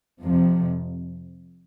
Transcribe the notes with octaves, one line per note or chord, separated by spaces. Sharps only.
F2 C3 F3